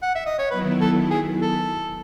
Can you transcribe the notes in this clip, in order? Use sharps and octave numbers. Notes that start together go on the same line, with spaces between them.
F#5
E5
D#5
C#5
D#3 F#3 B3 E4 B4
A4
G#4
A4